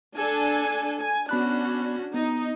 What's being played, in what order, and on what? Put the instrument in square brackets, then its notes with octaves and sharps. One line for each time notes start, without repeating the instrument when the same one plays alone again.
[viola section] D4 A4 G#5
G#5
[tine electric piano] B3 B5 F#6 [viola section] C#4 D4 F#4
[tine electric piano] B3 [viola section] D#4